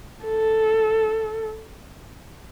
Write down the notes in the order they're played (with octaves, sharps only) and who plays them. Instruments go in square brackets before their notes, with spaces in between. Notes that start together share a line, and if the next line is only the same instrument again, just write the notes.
[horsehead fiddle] A4